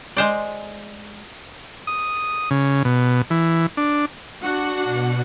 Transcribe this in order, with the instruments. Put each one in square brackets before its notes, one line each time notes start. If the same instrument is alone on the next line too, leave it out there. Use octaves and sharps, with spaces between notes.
[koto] G#3 C5 D5
[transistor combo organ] D#6
C#3
B2
E3
D4
[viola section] D4 F#4 F#5
[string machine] B2